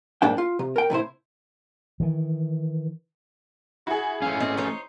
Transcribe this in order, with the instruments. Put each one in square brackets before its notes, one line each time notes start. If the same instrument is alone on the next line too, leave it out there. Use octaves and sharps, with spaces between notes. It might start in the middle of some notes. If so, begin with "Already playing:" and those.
[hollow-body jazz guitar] B1 G#2 A#3 D4 G5
F4
C3
A#4 G5
A2 C3 E4 C5
[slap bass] D#3 E3
[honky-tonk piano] E4 G#4 [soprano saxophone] F#4
[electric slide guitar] A3 C#4 [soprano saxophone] F5
[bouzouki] C4 [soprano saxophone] D#5
[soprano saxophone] D#4 [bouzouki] C5 C#5